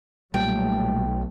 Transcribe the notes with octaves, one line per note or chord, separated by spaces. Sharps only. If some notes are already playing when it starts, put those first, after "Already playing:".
B1 A#2 F#3 G3 A3 G5